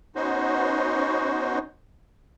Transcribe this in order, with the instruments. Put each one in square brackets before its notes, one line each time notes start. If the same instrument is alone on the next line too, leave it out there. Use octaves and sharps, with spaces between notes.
[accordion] B3 C#4 D#4 F#4 C5